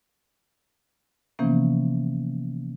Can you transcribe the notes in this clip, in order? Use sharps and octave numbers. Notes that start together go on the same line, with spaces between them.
C3 E3 F3 A#3 B3 C#4